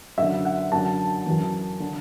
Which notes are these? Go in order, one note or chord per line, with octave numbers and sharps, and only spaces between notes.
F#2 D3 E5
F#5
F#2 D3 A5
F#2 E3
D3